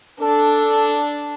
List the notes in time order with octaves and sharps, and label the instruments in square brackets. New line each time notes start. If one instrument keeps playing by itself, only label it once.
[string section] D4 [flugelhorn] A4